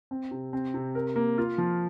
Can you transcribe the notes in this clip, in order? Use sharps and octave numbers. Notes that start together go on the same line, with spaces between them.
C4
C3
C4
C3
A#4
A#3
F4
F3